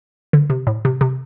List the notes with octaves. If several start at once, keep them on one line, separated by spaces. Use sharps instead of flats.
D3
C3
A2
C3
C3